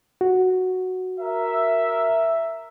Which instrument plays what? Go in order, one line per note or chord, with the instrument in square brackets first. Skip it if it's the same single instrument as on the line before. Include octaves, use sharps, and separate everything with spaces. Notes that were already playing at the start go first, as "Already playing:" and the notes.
[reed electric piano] F#4
[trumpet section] A#4 E5